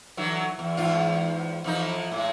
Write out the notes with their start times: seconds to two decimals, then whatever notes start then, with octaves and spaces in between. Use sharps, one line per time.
0.17 D3 E3 F#3
0.59 E2
0.77 E2 G#2 F4
1.64 F2 E3 D#4
2.12 A2 G#3